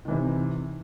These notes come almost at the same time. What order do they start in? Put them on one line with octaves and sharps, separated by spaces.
D#3 E3 C3